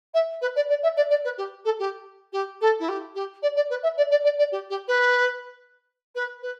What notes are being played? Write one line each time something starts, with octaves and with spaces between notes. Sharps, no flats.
E5
B4
D5
D5
E5
D5
D5
B4
G4
A4
G4
G4
A4
E4
G4
G4
D5
D5
B4
E5
D5
D5
D5
D5
G4
G4
B4
B4
B4